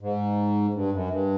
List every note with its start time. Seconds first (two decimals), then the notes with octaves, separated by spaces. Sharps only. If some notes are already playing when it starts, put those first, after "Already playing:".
0.01 G#2
0.74 G2
0.93 F#2
1.10 G2